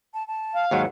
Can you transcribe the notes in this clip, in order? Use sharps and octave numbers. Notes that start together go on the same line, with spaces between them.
A5
A5
F5
D#2 G#2 F#3 F#5